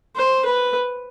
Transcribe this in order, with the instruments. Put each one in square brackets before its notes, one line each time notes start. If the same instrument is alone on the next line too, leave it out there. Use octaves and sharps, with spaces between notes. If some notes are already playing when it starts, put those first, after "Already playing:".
[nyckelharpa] C5
B4